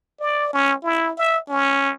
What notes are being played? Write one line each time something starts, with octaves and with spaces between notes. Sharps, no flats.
D5
C#4
E4
E5
C#4